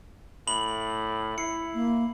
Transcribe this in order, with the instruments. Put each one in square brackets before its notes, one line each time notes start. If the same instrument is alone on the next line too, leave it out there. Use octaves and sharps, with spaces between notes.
[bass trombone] A2 [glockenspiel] B5 F#7
[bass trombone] E4 [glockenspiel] C7 C#7
[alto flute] A#3